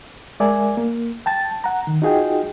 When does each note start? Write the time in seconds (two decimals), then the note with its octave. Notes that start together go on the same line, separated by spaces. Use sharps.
0.40 G#3 A#4 D5 E5 G#5
0.77 A#3
1.26 G5 A5 A6
1.64 F#5 A#5
1.87 D#3
2.02 D#4 F4 F#4 G#4 D#5 G5